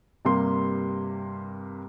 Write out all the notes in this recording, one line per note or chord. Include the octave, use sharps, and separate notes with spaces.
G2 C3 G3 A#3 C6